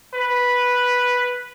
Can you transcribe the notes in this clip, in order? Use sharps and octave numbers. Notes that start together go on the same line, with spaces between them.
B4